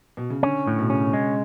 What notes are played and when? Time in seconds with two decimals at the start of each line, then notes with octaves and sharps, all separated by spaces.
0.17 B2
0.30 C#3
0.43 D3 C#4
0.67 A2
0.79 B2
0.90 C#3 C#4
1.13 G#3